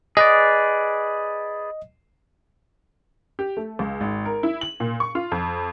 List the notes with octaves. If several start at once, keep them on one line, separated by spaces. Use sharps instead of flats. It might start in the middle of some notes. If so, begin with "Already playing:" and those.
G#4 B4 D5 D#5
G4
A3
C#2
G#1
A#4
E4
F#7
A#2
C#6
F4
F2